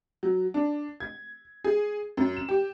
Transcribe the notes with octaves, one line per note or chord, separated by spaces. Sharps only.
F#3
D4
G#6
G#4
F#2
E7
G4